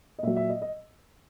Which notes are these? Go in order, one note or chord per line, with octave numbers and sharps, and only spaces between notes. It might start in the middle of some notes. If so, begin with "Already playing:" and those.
D#5
A#2 F#3 E5
E5
D#5
D#5